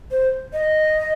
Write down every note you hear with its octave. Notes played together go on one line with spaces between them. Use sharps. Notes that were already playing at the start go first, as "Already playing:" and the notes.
C5
D#5